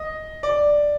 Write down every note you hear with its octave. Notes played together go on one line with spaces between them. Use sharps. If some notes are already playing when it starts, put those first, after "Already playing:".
Already playing: D#5
D5